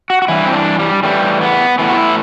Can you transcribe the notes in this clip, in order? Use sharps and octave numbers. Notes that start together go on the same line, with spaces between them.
F#4
F#4
G2 E3 E4
C4
D4
G3
A2 E3 G3
B3
A2 E3 B3
F#4
E4